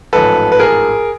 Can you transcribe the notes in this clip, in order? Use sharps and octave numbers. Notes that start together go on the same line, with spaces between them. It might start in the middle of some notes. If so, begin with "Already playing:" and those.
A1 G#2 F3 A4 B4
B4
G#4 A#4